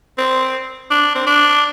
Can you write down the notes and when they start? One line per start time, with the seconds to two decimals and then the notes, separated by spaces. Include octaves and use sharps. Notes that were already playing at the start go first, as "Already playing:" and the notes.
0.18 C4
0.91 D4
1.15 C4
1.27 D4